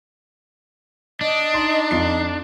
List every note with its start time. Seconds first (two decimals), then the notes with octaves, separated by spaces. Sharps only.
1.21 D4 D#5
1.54 D#4 C6
1.91 F2 F4 C7